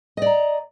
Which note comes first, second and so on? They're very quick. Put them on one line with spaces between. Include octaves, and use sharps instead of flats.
D#5 D5 A#5